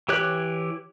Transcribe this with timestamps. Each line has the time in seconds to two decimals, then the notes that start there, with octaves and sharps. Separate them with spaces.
0.09 E3 G4 C#5 F#6